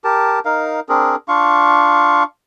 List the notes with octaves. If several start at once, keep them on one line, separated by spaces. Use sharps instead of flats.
G4 A#4 A5
D#4 A#4 F5
C4 D4 G#4 A#4
D4 F4 F5 C#6